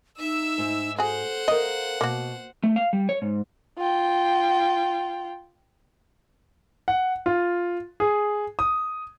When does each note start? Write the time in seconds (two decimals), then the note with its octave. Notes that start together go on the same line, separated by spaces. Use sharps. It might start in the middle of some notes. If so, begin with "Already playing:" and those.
0.19 D#4 E5 E6
0.58 G#2
0.99 F#4 G#4 A4 C5 F#5
1.48 A#4 D#5 F5
2.01 B2 A#3 F#4
2.64 A3
2.76 F5
2.93 G3
3.09 C#5
3.22 G#2
3.79 F4 G5
6.88 F#5
7.26 F4
8.00 G#4
8.59 D#6